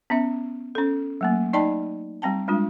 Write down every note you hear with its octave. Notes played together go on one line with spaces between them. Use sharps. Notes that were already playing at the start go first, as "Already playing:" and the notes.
B3 C#4 E5
C#4 A4
F#3 A3 A#3
D#4 D5 D#5 G5 A5 B5
G3 C4 G5 A5
G3 G#3 D4 F4